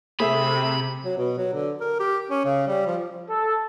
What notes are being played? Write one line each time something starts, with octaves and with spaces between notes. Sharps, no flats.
C3 A3 G#4 C5 E5 B5
F#3
B2
F#3
D3
A#4
G4
C#4
C#3
G3
F3
A4